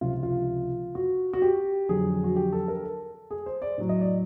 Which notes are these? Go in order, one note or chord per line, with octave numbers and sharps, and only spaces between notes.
C#2 C3 F3 F4
F4
F#4
F#4
G4
F2 D3 F#3 G#4
F#4
G4
A4
A#4
A4
G#4
C5
D5
A2 F#3
D#5
D5